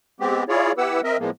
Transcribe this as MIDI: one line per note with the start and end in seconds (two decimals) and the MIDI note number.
0.20 0.44 56
0.20 0.44 59
0.20 0.44 60
0.20 0.44 67
0.49 0.72 64
0.49 0.72 65
0.49 0.72 68
0.49 0.72 73
0.49 0.72 74
0.78 1.01 59
0.78 1.01 64
0.78 1.01 67
0.78 1.01 71
0.78 1.01 78
0.78 1.01 88
1.04 1.17 60
1.04 1.17 70
1.04 1.17 75
1.04 1.17 76
1.19 1.30 45
1.19 1.30 53
1.19 1.30 56
1.19 1.30 58
1.19 1.30 59